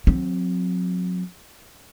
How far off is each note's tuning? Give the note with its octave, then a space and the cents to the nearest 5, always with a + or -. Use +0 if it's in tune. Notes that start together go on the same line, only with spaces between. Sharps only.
F#3 -35 C4 +0